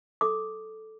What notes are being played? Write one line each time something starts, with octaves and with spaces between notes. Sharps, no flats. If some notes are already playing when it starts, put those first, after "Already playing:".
A4 D6